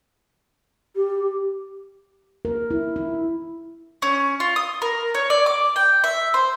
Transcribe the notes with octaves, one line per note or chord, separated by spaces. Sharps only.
G4
A#4
E4
E4
C#4
F4
D#6
A#4
C#5
D5
D6
G5
E5
C5